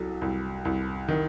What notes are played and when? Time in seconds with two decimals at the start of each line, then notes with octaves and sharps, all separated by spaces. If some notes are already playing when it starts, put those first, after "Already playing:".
Already playing: C2 F#3 A4
0.21 C2
0.65 C2
1.08 D#3